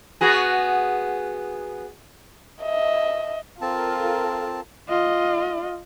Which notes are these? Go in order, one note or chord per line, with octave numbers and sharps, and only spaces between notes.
B3 F#4 G#4
D#5 E5
C4 F4 A4 A#4 A5
F4 D#5